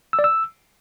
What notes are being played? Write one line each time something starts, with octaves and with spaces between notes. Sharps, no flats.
E6
D5
E6